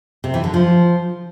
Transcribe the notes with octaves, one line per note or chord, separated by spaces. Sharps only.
C3
E3
D3
F3